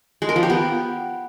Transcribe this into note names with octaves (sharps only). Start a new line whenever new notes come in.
G#3
A#4
F3
G4
B3